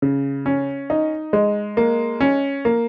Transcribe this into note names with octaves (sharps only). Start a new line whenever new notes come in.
C#3
C#4
D#4
G#3
A#3
C#4
A#3